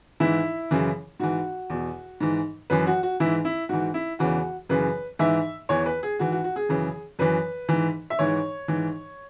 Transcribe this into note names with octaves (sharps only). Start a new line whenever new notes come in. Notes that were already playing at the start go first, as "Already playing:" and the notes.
G#2 E3 E4
F#2 C#3 E3
G#2 E3 F#4
E2 B2
G#2 E3
F#2 E3 B4
F#4
F#4
G#2 E3 E4
E4
G#2 E3 F#4
E4
E2 C#3 E3 F#4
F#2 C#3 E3 B4
G#2 E3 E5
E2 E3 C#5
B4
G#4
G#2 E3 F#4
F#4
F#4
G#4
F#2 C#3 E3
F#2 E3 B4
G#2 E3
E5
G#2 E3 C#5
G#2 E3